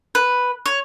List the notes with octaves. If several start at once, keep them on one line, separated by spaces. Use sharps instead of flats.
B4
C#5